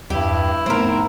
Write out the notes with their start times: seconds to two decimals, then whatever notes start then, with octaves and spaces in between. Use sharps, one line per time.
0.10 E2 G2 G3 E4 G4
0.66 G#2 F3 A3 B3 C4 A#4